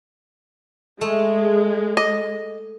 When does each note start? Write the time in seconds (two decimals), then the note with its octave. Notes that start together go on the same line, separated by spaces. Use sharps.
1.01 G#3 A3
1.97 D#5